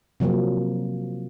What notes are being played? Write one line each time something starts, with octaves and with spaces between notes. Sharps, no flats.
C3 F3 F#3 A#3 C4